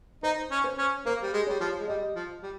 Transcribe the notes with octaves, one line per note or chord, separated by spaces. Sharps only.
D#4 C5
C#4
C5
C#4
A#3 C5
G3
G#3
G3 C#5
F3
G#3
G3 D#5
F3
G3